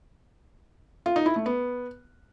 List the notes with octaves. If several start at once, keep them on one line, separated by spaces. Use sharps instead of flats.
F4
D#4
E4
A3
B3